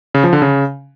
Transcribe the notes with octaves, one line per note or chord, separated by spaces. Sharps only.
C#3
F3
D3
C#3